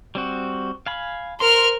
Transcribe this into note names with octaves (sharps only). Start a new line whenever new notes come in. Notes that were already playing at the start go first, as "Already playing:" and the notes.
G3 C4 F#4
F5 G#5 B5
A#4 C5 C6 F6